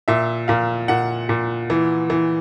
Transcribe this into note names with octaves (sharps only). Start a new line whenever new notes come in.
A#2 E5
A#2 F5
A#2 F#5
A#2
E3
E3